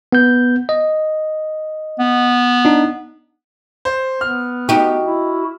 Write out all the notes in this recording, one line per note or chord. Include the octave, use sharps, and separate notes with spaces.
B3 G6
D#5
B3
D4 D#4
C5
B3 F6
D#4 F#4 G4
E4